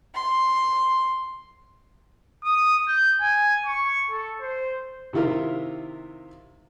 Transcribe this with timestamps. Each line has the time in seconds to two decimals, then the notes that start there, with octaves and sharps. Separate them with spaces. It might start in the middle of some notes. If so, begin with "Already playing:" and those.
0.15 C6
2.44 D#6
2.88 G6
3.21 G#5
3.66 C#6
4.10 A4
4.41 C5
5.13 C3 D#3 E4 F4 A#4